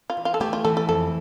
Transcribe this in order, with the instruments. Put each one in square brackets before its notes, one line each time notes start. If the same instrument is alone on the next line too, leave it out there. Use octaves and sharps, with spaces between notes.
[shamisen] F4
[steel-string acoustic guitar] E3
[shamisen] F4
A4
[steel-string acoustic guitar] A3 [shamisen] G4
[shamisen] F4
[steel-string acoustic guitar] E3 [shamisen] A4
[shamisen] A4
[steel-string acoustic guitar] F2 [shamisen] A4